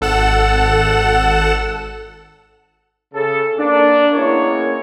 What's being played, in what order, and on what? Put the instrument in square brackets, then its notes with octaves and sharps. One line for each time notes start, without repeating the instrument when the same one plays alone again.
[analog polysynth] G#1 A4 F#5 E7
[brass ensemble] C#3 A4
A#3 D4
G#3 A#3 B3 C#4 E4 C#5